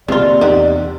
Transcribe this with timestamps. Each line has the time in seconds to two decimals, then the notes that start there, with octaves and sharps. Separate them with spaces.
0.08 C3 D#3 F3 A#3 F4 D5
0.41 E2 C4 D#4 G4 F#5